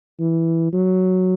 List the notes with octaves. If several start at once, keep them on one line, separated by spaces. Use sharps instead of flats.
E3
F#3